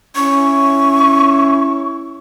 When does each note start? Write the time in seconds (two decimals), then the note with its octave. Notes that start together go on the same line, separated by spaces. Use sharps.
0.16 C#4 E4 C#6